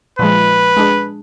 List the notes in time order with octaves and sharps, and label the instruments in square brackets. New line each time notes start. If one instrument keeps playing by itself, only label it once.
[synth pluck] A#2 F3 G#3 [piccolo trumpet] B4
[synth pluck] G#3 D4 G#4